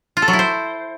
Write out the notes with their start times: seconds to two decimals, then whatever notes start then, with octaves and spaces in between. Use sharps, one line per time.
0.17 F4
0.22 A4
0.28 F#3
0.33 E4
0.39 C5